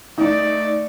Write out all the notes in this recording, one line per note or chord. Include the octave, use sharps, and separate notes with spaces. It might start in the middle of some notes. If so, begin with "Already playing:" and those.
A3 D#4 D5